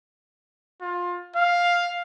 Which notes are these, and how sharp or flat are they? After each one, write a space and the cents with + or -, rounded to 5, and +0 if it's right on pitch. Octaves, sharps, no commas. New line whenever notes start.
F4 +20
F5 +5